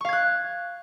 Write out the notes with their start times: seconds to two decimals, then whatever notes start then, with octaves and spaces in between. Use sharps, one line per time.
0.01 C#6
0.05 F5
0.09 G#6
0.13 F#6